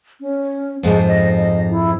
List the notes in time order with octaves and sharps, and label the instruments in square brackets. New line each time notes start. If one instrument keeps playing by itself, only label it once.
[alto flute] C#4
[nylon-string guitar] F2 G#2 F3 [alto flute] G#3
[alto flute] D#5
D#5
E4